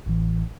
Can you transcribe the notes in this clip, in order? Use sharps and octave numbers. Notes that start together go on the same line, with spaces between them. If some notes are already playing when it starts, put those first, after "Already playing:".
A1 A2 E3